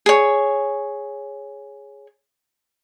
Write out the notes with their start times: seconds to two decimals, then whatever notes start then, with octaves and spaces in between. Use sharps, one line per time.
0.06 G#4 C#5